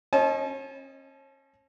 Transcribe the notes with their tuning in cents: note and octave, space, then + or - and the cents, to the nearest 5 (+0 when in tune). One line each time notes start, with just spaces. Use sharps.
C#4 -40 D#5 +0 A5 -35